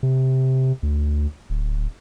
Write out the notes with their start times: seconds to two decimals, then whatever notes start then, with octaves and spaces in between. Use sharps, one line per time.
0.03 C3
0.83 D2
1.50 D1